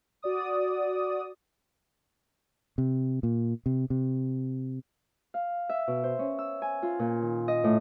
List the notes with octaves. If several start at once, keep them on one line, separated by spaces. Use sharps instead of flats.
F#4 D5 D#6
C3
A#2
C3
C3
F5
E5
B2
C5
C#4
E6
G#5
F4
A#2
D#3
D#5
A2